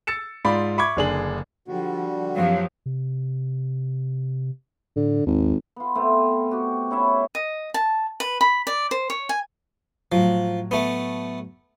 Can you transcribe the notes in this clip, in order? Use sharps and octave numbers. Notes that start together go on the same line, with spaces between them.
E6 A6 C#7 E7
G#2 F4 D5 B5
E5 B5 C#6 D6 G#6
F#1 D3 D4 G#4 F#7
D3 F3 G3 F#4
F#2 F3 F#3 B3 G4 F5
C3
A2 D3
G#1 D#2
B3 F4
A3 B3 C4 F4
F#4 G4
C#4 E4 C#5 E5
D#5
A5
B4
B5
D5
C5
C#5
G#5
A2 F3 F#3
A3 B3